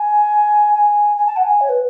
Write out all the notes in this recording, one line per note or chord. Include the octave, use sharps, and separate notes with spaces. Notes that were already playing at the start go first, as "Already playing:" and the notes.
Already playing: G#5
G#5
G#5
A5
F#5
G#5
C#5
B4